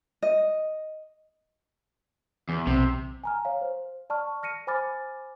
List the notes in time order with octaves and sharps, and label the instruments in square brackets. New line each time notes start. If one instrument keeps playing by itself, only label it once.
[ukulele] D#5
[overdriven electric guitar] E2
[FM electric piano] B1 [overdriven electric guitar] C3
[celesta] G#5 A#5 F6
C#5 F5
C5
D5 A5 C#6 F6
F6 A#6 C#7 D#7
C5 G#5 B5 D6 F6 A6